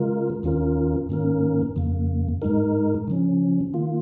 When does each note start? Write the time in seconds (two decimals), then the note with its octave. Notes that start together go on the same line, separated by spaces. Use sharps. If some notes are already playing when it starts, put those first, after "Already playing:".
Already playing: C#3 G#3 F4 A#4
0.43 D#2 D#3 C#4 F4 A#4
1.09 G#2 D#3 A#3 C#4 A#4
1.76 F2 C#3 A#3
2.42 G#2 G#3 D#4 A#4
3.08 C#3 F3 C#4
3.74 D#3 A#3 F4